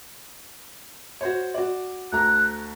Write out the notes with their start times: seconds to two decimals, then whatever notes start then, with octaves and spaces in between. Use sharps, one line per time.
1.21 F#4 C5 C#5
1.54 F#4 D5
2.12 D2 A4 A#5 F#6